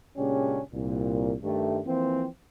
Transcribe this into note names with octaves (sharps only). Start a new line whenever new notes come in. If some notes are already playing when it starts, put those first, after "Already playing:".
A#2 C#3 G#3 C#4 D4 G4
C2 A#2
G2 D#3 G3 A3
E3 F3 A#3 C4